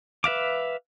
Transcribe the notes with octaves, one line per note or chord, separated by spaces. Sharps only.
B4 E5 F5 D6